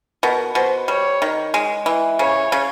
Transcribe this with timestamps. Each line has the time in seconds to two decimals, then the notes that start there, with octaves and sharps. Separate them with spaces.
0.23 B2 A#4
0.55 B2 C5
0.88 G3 C#5
1.22 D#3
1.54 G#3
1.86 E3
2.19 C#3 C#5
2.52 C#3